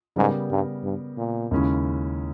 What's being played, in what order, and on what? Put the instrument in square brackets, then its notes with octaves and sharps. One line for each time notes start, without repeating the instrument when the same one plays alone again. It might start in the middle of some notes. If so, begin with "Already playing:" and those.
[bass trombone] G#2 [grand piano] C#3 G3 B3 G4 A#4
[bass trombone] G2
G2
A#2
[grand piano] D#2 C#3 G#3 C#4 E4